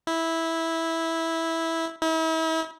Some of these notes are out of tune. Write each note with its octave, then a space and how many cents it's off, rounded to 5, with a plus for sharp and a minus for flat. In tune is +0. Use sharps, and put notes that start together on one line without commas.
E4 -10
E4 -40